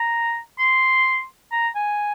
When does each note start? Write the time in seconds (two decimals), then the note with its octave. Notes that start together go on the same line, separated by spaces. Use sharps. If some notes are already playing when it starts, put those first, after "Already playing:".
Already playing: A#5
0.59 C6
1.52 A#5
1.75 G#5